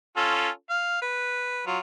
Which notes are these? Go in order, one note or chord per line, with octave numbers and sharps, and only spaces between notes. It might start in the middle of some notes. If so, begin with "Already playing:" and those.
C#4 F4 A4
F5
B4
F#3 F4